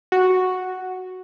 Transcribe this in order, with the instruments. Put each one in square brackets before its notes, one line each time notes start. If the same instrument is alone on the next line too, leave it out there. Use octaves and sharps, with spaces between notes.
[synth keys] F#4